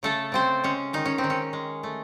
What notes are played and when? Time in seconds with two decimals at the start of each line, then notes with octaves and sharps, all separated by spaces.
0.03 C#3 A3 A4
0.32 C#3 C4 C5
0.64 G#3 C#4
0.93 D#3 D#4
1.06 C#4
1.18 C4
1.24 D#3
1.30 C#4
1.53 G#3
1.83 A3